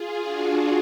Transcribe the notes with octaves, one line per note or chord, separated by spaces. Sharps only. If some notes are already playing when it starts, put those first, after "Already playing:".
Already playing: F4 G#4
D4 F#4